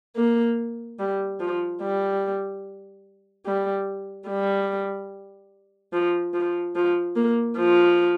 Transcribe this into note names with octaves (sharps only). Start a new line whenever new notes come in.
A#3
G3
F3
G3
G3
G3
F3
F3
F3
A#3
F3